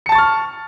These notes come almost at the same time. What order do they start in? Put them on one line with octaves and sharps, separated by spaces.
C#7 A5 A6 C#6 F6